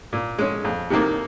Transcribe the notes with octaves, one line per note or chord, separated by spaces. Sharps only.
A#2
G#3 C#4
F2
C3 D#3 A#3